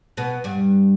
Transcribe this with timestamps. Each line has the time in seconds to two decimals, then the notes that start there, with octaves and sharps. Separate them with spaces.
0.17 B2 B3
0.44 G2 G3